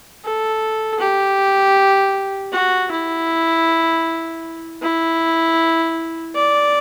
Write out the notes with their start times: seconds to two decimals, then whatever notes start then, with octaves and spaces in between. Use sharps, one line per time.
0.25 A4
1.00 G4
2.53 F#4
2.91 E4
4.82 E4
6.35 D5